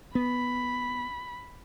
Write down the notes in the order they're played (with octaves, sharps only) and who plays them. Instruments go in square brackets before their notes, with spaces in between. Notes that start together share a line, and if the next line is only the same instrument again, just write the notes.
[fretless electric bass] B3 [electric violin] B5